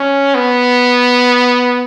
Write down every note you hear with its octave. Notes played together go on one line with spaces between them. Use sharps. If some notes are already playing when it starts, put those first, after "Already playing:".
Already playing: C#4
B3